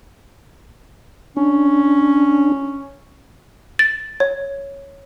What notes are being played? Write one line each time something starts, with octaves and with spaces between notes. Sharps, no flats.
C#4 D4
A6
C#5